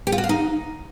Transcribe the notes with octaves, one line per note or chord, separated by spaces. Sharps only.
G4
F4
F#4
F5
D#4